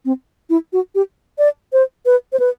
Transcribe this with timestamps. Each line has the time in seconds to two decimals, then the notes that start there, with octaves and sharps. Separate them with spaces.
0.05 C4
0.50 E4
0.73 F#4
0.95 G4
1.38 D5
1.73 C5
2.06 B4
2.33 C5
2.40 B4